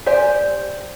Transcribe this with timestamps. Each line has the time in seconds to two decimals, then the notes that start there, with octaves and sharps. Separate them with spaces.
0.06 G4 C5 D5 G#5